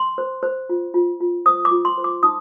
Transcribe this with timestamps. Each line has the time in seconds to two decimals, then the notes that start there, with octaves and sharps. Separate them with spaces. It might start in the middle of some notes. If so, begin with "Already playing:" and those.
Already playing: C6
0.18 C5
0.43 C5
0.69 F4
0.94 F4
1.20 F4
1.46 C5 D#6
1.65 D6
1.71 F4
1.85 C6
1.98 C5
2.04 D6
2.23 D#4 D#6